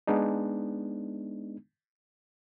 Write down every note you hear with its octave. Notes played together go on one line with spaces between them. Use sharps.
G#3 B3 D4 D#4